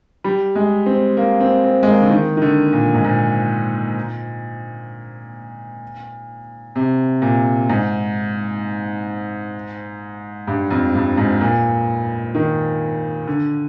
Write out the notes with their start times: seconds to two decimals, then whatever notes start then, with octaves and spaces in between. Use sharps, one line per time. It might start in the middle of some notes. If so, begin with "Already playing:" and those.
0.24 G3
0.55 G#3
0.86 C4
1.17 A#3
1.40 C4
1.64 C4
1.83 G#3
1.87 A#3
2.00 D3
2.10 D#3
2.37 D#3
2.42 D3
2.73 A#2
2.94 G#2
3.04 A#2
6.76 C3
7.22 A#2
7.69 G#2
10.47 G2
10.71 F2
10.95 G2
11.17 G#2
11.41 A#2
12.34 D#3
13.27 D3